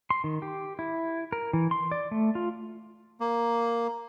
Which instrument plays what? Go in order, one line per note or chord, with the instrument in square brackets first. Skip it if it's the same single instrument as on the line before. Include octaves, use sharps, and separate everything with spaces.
[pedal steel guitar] C6
D#3
G4
E4
A#4
E3
C6
D5
A3
F4
[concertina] A#3